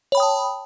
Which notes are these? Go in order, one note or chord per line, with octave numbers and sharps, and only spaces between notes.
C#5 G5 A5 B5 D#6